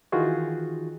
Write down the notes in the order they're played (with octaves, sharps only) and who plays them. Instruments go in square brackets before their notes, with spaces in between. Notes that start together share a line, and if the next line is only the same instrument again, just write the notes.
[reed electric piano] D#3 E3 D#4 F4 F#4 G#4